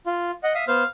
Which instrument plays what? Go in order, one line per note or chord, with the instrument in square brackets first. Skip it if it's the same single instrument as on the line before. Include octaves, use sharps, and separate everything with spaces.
[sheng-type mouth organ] F4
D#5 F#5
E5 F5 D#6
[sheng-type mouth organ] B3 C5 [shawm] F5